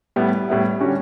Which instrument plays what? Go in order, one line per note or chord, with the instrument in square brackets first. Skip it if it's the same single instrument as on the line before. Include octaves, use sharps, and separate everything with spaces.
[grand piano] A2 G3 B3 E4
A2 G3 B3 E4
D3 G3 C#4 F#4